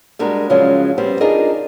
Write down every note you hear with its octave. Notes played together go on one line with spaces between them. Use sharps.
G3 G#3 D4 F#4 A#4
C#3 F3 F#3 G#3 C#4
G3 B3 C4 G4
D4 D#4 F4 G#4 A#4 D#5